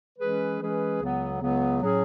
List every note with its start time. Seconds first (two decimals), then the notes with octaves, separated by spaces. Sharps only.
0.19 E3 G#3 C#4 G#4 B4
0.59 E3 G#3 C#4 G#4 B4
1.00 C#2 C#3 F#3 B3
1.40 C#2 C#3 F#3 B3
1.81 A2 F#3 C#4 G#4